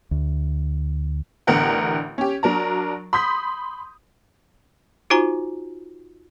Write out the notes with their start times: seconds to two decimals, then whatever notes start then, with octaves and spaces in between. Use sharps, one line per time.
0.11 D2
1.47 A1 D3 B3 A#4 F#5 G5
2.18 C#4 G4
2.43 F#3 D4 A#4 A5 A#5
3.13 B5 C6 D#6 G6 B6
5.10 D#4 F4 F#4 C5 G#5 A#5